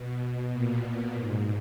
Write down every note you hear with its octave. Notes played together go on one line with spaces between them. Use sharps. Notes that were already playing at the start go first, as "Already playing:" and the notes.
Already playing: B2
A#2
G#2